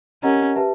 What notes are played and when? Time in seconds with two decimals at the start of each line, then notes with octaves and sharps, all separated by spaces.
0.23 C#4 G4 A#4 D#5 F#5 A#5
0.56 G4 B4 E5 A5